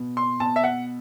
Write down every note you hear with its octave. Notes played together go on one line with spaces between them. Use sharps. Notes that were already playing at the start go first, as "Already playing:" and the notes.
Already playing: B2
C6
B2 A5
E5
F#5